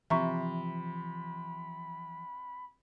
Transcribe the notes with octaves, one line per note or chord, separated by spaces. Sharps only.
C3 E3 F3 E5 A#5 B5 C#6